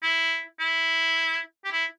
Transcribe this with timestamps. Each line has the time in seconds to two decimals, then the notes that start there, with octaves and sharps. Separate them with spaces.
0.03 E4
0.60 E4
1.65 G4
1.72 E4